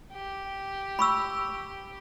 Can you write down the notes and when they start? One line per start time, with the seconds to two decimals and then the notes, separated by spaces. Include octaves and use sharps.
0.13 G4
0.99 B5 C#6 E6